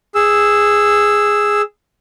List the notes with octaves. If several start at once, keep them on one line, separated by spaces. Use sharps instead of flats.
G#4 E6